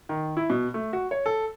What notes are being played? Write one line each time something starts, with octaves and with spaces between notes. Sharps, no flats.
D#3
E4
B2
A3
F#4
C#5
A4